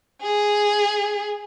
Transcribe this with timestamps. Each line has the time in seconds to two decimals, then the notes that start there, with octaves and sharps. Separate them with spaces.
0.22 G#4